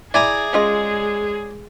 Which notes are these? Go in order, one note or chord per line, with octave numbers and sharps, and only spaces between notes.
E4 G#4 D5 G#5 A#5
G#3 C#4 F4 D#5